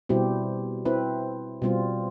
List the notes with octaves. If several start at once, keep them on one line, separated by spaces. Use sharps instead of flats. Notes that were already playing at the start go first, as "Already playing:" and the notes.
B2 G3 C4 E4 G4
C4 E4 B4
B2 G3 C4 F4